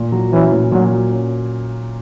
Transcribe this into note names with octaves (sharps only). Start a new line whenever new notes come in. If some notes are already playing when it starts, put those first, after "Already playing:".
Already playing: A#2
F#3
E3 C#4
A#2
A#2 F#3
F#3
C#4